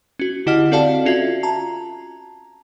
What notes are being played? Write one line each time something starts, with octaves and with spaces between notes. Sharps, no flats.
C#4 F#4
D3 E4 G4 D#5 F#5 F6
C4 F#4 A4 D5 F5 A5
C#4 F4 F#4 E5 G#6
A5 A#5